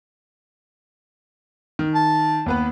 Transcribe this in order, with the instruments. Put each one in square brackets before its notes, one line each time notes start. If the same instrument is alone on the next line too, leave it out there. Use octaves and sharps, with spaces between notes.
[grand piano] D#3
[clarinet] A5
[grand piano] D#2 B3 B4